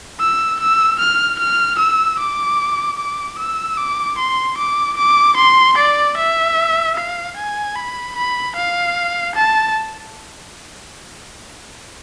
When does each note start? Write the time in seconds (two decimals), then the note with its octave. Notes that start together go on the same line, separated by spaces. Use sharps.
0.20 E6
0.60 E6
0.99 F6
1.39 F6
1.78 E6
2.19 D6
2.98 D6
3.38 E6
3.77 D6
4.18 C6
4.57 D6
4.97 D6
5.37 C6
5.77 D5
6.17 E5
6.96 F5
7.36 G#5
7.76 B5
8.16 B5
8.56 F5
9.35 A5